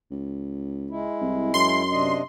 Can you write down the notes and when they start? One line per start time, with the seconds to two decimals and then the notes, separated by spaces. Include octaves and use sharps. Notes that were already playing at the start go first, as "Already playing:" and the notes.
0.11 C#2
0.90 G#3 E4
1.21 C2
1.54 F#2 C6
1.91 C3 D4 D#5